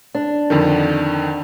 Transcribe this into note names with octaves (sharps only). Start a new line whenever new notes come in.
D4
F2 D3 D#3